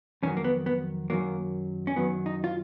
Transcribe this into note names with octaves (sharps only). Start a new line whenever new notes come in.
F2 D#3 F#3 C#4
A#3
B3
B3
F#2 D#3 F#3 A#3
C#4
F#2 D#3 F#3 B3
D#4
F4